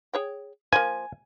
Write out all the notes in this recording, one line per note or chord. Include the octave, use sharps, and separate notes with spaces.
G#4 C#5 G5
F3 A#3 G#5